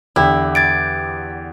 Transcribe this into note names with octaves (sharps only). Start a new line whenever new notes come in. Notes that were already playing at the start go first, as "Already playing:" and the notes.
E2 D3 E4 G4
G#6 A6 D7